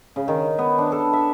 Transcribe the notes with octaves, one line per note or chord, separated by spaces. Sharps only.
C#3
D#3
B3
D4
A4
E5